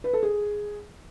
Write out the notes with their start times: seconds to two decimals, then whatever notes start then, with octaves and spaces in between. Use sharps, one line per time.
0.04 B4
0.13 A4
0.23 G#4